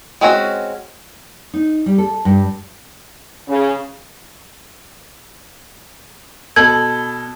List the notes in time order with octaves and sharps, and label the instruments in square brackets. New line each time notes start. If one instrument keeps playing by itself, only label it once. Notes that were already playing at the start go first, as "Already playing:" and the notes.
[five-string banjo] G#3 C4 C#4 F#4
[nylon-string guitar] D#4
G3
A4
G2
[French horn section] C#3
[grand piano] B2 A4 F#7 [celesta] G#6